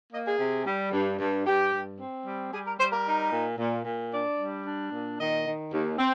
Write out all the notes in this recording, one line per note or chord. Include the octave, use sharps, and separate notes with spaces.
A#3 D#5
G#4
C3
G3
G2
G2
G2 G4
G2
C4
G3
G3 G#4
A#4
G3 C5
A#4
D#4
A#2
A#2
A#2
D4 D5
G3
D4
A#2
D#3 D#5
D#3
D#2
C4